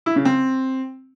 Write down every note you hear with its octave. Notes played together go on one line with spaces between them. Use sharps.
E4
C#3
C4